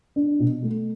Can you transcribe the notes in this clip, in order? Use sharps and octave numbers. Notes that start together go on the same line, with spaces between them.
D4
B2
A3